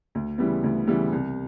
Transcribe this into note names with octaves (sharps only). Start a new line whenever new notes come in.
D2
C#3 E3 G3 B3
D2
C#3 E3 G3 B3
C2